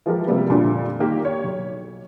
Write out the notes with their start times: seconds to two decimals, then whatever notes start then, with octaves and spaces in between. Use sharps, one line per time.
0.06 E3 F3 G#3 G4 A#4
0.27 C#2 C3 F3 G3 A#3 B3
0.49 F2 A#2 D3 G3 D4
1.00 D#3 A#3 G4
1.25 C#5
1.44 B1